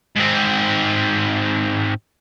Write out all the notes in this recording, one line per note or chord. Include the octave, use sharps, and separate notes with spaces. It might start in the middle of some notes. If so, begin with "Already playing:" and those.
G#2 C4